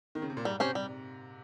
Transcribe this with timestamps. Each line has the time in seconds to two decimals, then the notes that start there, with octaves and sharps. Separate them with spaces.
0.15 D#3
0.22 C#3
0.30 C3
0.37 A#2
0.45 G#2 G3
0.60 C3 C#4 G4 C5
0.75 G3